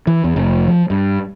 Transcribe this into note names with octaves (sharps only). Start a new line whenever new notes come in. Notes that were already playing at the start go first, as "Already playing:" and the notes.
E3
E2
F1
F3
G2